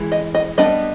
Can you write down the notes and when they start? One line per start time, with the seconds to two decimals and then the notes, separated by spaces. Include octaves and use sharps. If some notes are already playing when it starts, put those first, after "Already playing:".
Already playing: E3 G#3
0.12 D#5
0.34 D#5
0.58 G3 B3 D4 D#5